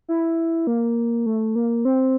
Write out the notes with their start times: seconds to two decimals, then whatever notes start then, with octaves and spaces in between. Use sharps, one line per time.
0.08 E4
0.67 A#3
1.26 A3
1.56 A#3
1.85 C4